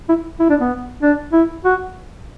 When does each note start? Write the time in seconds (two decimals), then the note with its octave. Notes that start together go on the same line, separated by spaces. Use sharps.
0.09 E4
0.40 E4
0.50 D4
0.60 B3
1.02 D4
1.33 E4
1.65 F#4